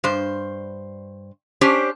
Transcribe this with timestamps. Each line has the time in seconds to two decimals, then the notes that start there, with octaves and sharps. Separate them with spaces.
0.04 G2 C5
1.61 C#4 D4 G4 C5